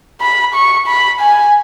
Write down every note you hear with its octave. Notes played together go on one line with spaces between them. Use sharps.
B5
C#6
B5
G#5